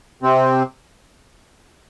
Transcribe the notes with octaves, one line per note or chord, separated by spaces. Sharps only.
C3 C4